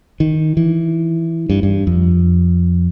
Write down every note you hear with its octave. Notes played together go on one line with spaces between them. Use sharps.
D#3
E3
G2
G2
F2